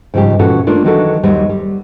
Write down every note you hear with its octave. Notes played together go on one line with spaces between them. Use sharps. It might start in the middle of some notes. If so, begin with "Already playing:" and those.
G#2 C#3 F3 G3 G4
A#2 E3 C#4 F4 F#4 A4
A3 A#3 D4 F4
D#3 E3 F#3 D4 F#4 A4
D#2 F#3 G3 C5
G3